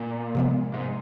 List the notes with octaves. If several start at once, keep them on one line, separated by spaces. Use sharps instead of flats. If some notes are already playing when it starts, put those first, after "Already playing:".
Already playing: A#2
C3 F3 G#3 B3
G#2